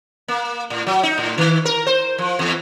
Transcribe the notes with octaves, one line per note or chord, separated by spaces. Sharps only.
A#3
A2
F#3
D#4
A2
D#3
A#4
C5
F3
E2